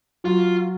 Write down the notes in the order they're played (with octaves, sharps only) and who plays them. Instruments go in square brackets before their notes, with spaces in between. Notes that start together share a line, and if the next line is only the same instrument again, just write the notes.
[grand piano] F#3 [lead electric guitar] F4